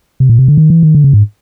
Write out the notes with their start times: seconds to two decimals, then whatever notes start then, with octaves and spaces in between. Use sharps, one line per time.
0.20 C3
0.29 A#2
0.39 C3
0.48 D3
0.57 D#3
0.70 E3
0.83 D#3
0.95 D3
1.04 C#3
1.13 G#2